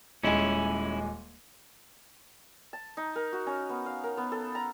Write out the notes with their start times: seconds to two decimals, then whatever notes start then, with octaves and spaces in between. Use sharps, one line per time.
0.23 D#1 G#3 C#4 E4 G#5
2.73 A5
2.97 D#4
3.16 A#4
3.32 F#4
3.46 C#4
3.69 B3
3.86 F5
4.04 A#4
4.17 B3
4.32 A4
4.55 A#5